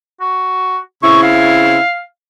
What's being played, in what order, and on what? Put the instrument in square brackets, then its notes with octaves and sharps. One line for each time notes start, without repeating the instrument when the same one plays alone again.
[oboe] F#4
[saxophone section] C#3 C4 E4 [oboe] C#6
[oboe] F5